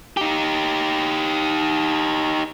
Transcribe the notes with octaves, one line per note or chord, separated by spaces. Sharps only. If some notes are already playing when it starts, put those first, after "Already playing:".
D#4 G4